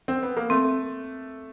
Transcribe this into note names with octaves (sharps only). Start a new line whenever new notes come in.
C4
B3
A#3
A3 C4